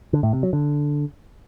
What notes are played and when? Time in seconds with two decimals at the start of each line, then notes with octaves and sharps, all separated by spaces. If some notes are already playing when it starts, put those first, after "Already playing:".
0.13 D3
0.23 A2
0.33 C3
0.43 F#3
0.53 D3